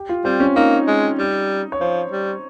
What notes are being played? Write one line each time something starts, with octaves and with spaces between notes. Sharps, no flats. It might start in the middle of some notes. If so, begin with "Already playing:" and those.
Already playing: G4
F4
G3 C4
C#4
A#3 D#4
G#3
G3
C#5
F3 C5
G3